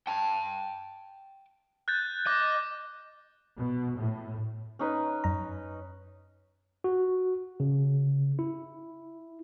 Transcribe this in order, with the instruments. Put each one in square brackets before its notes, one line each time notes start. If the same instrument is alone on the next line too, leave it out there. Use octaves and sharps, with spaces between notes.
[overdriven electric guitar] G5 A5
[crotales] F#6 G6 A6
[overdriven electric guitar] D#5 [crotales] D6
[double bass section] B2
A2
[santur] C#4 D#4 B4
[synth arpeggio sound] F#2 A#5
[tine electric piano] F#4
C#3
E4